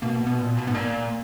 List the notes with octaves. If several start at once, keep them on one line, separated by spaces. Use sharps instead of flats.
B2 A#3
B2
B3
A#2
B2
G#2 B3
A#2 A#3